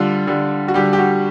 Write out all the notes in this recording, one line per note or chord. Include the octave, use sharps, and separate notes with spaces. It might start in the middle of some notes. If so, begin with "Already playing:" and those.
Already playing: D3 G3 F4
D3 G3
F#4
D3 G3 G4
G4
F#4